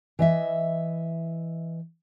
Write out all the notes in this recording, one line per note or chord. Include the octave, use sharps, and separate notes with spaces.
E3 D#5 E5